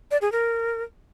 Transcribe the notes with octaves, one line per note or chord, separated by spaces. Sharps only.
D5
G#4
A#4